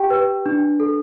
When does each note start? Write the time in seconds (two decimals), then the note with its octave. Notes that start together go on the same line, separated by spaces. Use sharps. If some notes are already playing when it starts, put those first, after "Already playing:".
Already playing: G4 G5
0.10 B4
0.46 D4
0.80 A4